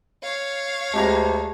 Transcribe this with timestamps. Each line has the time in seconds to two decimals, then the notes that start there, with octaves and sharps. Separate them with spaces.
0.23 C#5 F5
0.94 D2 G#3 G4 A5 A#5